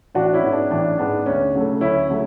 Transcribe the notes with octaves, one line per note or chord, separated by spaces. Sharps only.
A1 D4 F#4
C#4 E4
G#2 G#3 B3
D4
A1 D4
G#2 G#3 B3 D4
D2 C#4
C#3 F#3 A3
D2 C#4 E4
C#3 F#3 A3